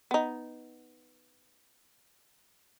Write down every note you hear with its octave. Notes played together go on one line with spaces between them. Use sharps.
B3 D#4